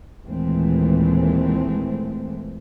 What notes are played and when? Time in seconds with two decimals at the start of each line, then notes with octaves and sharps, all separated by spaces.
0.24 D#2 A#2 E3 G#3 A3 C4